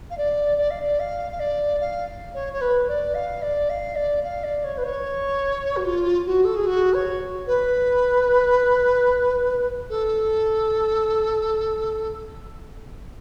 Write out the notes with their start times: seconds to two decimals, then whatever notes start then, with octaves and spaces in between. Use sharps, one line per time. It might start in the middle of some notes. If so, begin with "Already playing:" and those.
0.10 F5
0.17 D5
0.58 D5
0.70 F5
0.82 D5
0.99 F5
1.32 F5
1.39 D5
1.80 F5
2.34 C#5
2.53 C#5
2.61 B4
2.88 D5
3.14 F5
3.42 D5
3.69 F5
3.95 D5
4.23 F5
4.43 D5
4.64 C#5
4.77 B4
4.84 C#5
5.76 F#4
5.85 F4
6.26 F#4
6.44 A4
6.55 G#4
6.66 F#4
6.93 C#5
7.47 B4
9.89 A4